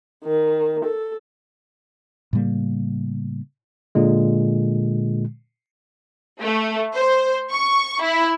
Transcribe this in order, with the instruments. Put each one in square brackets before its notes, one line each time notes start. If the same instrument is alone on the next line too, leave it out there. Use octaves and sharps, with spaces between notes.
[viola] D#3
A4
[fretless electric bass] A2 C#3 G3 A#3
[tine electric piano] A#2 D3 G#3
[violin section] A3
C5
C#6
E4